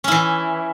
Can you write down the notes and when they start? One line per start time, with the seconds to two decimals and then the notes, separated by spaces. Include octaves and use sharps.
0.04 C#4
0.08 E4
0.12 E3